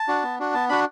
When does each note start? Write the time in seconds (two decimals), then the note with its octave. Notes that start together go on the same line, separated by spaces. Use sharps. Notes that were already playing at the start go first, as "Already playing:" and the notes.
Already playing: A5
0.08 D4 F#4
0.23 B3
0.39 D4 F#4
0.54 B3 A5
0.69 D4 F#4 B5